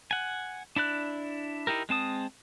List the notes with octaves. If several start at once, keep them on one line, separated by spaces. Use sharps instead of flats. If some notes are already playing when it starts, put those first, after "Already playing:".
F#5 G#5
D4 E4 D5 F#6
D#4 E4 G4 A#4
G#3 C4 A5 D#6